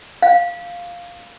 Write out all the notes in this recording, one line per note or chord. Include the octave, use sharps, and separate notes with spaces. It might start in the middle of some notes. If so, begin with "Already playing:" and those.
F5